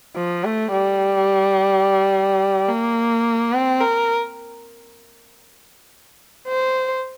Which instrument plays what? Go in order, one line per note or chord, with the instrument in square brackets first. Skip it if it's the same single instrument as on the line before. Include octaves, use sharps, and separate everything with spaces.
[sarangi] F3
A3
G3
A#3
C4
A#4
C5